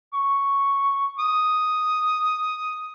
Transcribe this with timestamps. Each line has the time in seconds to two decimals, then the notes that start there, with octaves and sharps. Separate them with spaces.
0.14 C#6
1.19 D#6